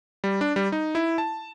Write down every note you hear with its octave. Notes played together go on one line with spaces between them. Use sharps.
G3
D4
G3
D#4
E4
A5